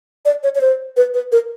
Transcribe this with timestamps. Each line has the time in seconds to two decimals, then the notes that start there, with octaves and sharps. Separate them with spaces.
0.25 D5
0.43 C#5
0.55 C#5
0.61 C5
0.97 B4
1.14 B4
1.32 A#4